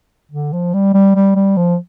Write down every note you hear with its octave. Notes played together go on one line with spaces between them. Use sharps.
D3
F3
G3
G3
G3
G3
F3